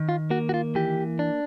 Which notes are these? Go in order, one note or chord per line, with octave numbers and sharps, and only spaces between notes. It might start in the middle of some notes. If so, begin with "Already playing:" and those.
Already playing: D#3
F4
A#3 F#4
F#4
F4
E3 G4
D4